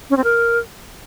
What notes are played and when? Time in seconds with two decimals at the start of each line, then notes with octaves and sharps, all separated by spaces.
0.10 C#4
0.17 C4
0.24 A#4